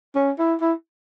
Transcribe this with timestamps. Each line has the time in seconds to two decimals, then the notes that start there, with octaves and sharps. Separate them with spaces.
0.15 C#4
0.39 E4
0.61 E4